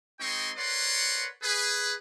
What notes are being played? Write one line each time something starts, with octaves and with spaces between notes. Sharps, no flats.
G#3 C4 D#4 G5 C6 C#6
A#4 B4 C#5 D5 F#5 C6
G#4 B4